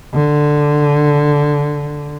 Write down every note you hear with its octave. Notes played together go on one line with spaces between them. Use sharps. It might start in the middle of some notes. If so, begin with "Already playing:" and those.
D3